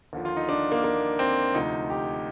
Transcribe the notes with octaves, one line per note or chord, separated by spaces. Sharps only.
D#2 D3 F3
F4
D#4
D4
A#3
A#3
C4
D2 C3 F3 D#4
G4